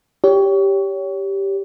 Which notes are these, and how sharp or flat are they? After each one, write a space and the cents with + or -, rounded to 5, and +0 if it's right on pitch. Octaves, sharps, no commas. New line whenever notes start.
G4 +0 C#5 +25